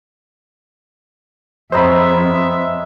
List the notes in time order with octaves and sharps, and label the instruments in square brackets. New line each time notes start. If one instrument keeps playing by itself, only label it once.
[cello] F2 [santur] G#3 B3 C#4 [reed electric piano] C5 A#5 B5 [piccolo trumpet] E5